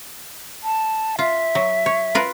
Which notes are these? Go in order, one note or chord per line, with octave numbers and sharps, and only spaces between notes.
A5
F4 E5
F#3
C#5
F4 A#4 B4